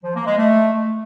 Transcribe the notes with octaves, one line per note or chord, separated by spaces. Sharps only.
F3
A#3
G#3
A3